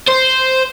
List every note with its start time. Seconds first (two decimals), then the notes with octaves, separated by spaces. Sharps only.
0.08 C5